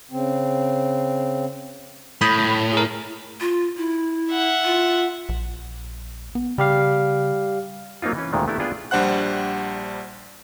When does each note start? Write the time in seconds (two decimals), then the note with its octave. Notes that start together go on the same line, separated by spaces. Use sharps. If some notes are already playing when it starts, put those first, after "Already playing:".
0.11 C#3 C4
2.21 A2 B5 D#6 G6
2.73 G#4 A#4
3.40 F4
3.77 E4
4.31 E5 F#5
4.65 F4
5.29 A#1
6.35 B3
6.58 C#3 G3 G4 F5
8.02 F#3 A#3 C4 D#4 F4
8.15 E3 C#4
8.33 D2 A#2 D#3 G#3 A3
8.48 A3 B3 D4 E4 G4
8.59 B3 D4 F4 G#4 D5 G5
8.91 A#1 G3 D4 C5 F#5 F#6